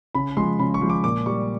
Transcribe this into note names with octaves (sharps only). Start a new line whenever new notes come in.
C#3 B5
F3 G#3 C6
C#3 B5
C#6
F3 G#3
D6
A#2 D6
G3 C#6